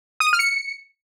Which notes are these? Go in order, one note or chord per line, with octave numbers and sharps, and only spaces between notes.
D#6
D#7
F6
C#7